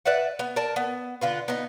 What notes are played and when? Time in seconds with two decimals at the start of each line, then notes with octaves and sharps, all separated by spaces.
0.05 B4 D5 E5 F#5
0.39 B3
0.56 A#4 D5 A5
0.76 B3
1.21 D3 F4 B4
1.48 B3 D#4